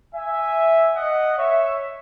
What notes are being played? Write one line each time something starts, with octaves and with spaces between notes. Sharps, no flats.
E5 G#5
D#5 F#5
C#5 E5